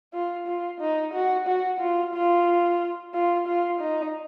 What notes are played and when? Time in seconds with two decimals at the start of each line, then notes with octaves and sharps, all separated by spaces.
0.13 F4
0.48 F4
0.81 D#4
1.13 F#4
1.47 F#4
1.80 F4
2.13 F4
3.14 F4
3.47 F4
3.80 D#4